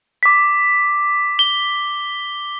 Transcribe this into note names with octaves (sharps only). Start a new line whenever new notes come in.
D6 B6
G7